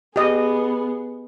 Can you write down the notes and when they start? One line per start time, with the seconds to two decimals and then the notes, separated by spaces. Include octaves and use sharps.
0.16 B3 G4 G#4 D#5